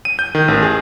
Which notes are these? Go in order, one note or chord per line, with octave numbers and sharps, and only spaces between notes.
D#7
G6
D#3
A1
G#4